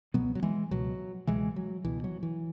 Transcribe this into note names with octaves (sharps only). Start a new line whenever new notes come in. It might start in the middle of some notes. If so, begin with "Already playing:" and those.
C#2 B2 F#3 B3
F#3
E3 G#3
C#2 B2 F#3
C#2 B2 E3 G#3
F#3
C#2 B2 E3
F#3
E3